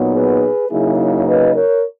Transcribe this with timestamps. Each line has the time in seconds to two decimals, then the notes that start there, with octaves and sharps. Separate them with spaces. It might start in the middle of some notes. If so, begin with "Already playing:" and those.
Already playing: A#2 F#3 B3 D#4
0.13 G#4 B4
0.69 C#3 F#3 A#3 D#4 E4 G#4
0.98 E4
1.26 B4 D#5
1.54 A#4 C#5